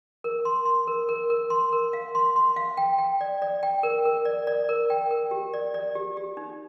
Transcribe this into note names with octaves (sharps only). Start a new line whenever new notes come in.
A#4
C6
C6
A#4
A#4
A#4
C6
A#4
F5
C6
C6
F5
G5
G5
D5
D5
G5
A#4
A#4
D5
D5
A#4
G5
A#4
G4
D5
D5
G4
G4
D#4